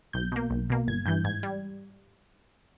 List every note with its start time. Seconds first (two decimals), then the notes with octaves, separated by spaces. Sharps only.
0.13 B1 G6
0.32 B2 A#3
0.50 B1
0.70 B2 A#3
0.87 G1 G#6
1.06 G2 E3 G6
1.24 G#2 G#6
1.43 G3